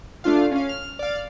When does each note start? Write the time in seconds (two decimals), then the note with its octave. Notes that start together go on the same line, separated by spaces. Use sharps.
0.24 A3 D4 F4 F5
0.52 C#4 F5
0.69 F6
0.99 D5 F5